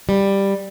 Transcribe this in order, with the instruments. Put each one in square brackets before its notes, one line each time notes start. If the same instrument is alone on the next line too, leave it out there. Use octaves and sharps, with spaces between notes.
[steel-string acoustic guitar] G3